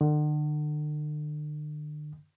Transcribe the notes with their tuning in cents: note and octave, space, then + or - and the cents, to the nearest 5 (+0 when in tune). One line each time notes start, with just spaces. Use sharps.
D3 +40